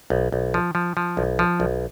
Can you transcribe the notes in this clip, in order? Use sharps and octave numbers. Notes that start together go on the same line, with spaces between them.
B1
B1
F3
F3
F3
B1
F3
B1